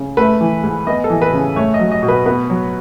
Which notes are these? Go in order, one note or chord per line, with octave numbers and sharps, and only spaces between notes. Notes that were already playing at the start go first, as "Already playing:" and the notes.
Already playing: C#3
A3 B4
E3
G#2
B3 D#5
A4
E3
B4
C#3
A3 C#5
D#5
F#3
D#5
B2
B4
B3 B4
F#3